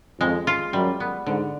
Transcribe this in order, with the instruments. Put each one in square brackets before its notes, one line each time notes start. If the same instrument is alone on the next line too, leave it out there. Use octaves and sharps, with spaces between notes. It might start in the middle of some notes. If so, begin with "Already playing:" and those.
[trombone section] F2 [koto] G#3
[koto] F4
[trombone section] F#2 [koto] G3
[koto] B3
[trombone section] G#2 [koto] D3